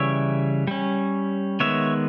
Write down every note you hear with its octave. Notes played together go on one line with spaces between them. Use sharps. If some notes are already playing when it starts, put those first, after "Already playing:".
Already playing: C#3 E3 G3 C#5 E5
G3 C#4
D#3 G#3 B3 C#5 E5